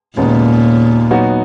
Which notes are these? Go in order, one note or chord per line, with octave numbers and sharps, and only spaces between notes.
D#2 A#2 C#3 G#3 B3 D#4
F#3 B3 D#4 F#4